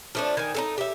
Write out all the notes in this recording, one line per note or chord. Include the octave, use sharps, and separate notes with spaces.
F3 A3 D4
D#3 G#5
A3 C#4 D#4
G4 E5